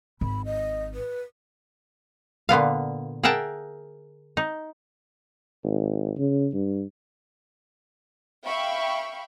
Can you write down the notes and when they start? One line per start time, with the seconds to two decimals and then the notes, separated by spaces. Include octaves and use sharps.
0.21 G#1 B5
0.45 D#5
0.94 B4
2.49 A#2 D3 B3 F5
3.24 G#4 A#4 E5 F#5 G5 A5
4.37 D#4
5.64 G#1
6.17 C#3
6.53 G2
8.44 E5 F5 G5 B5 C#6